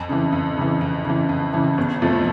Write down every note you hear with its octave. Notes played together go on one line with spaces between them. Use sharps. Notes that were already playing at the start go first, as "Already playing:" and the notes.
Already playing: F2
C#3 E3
F2
C#3 E3
F2
C#3 E3
F2
C#3 E3
G1
F2 C3 F3 A3